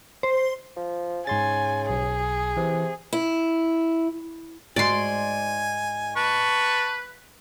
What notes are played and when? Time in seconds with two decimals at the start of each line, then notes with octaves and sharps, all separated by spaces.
0.23 C5
0.76 F3
1.27 G#2 C#3 G#5 C6 A6
1.90 B1 G#4
2.57 C3 E3
3.13 E4
4.76 G#2 F#4 D5 G#5 C6
6.16 B4 A5 C#6